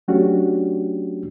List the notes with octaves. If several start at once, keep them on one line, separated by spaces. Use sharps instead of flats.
F#3 A3 C#4 D4 F#4 G4